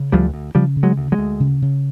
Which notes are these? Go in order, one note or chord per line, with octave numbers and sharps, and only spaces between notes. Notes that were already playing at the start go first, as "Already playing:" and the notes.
Already playing: C#3
D2 F3 G3
D2
C#3 F3 G3
C#3
F#3 G#3
D2
F#3 G#3
D2
C#3
C#3